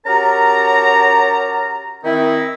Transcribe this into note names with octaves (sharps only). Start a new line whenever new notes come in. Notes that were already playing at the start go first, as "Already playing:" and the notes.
C#4 F#4 G4 A#4 A5 A#5
D#3 C4 D#4 E4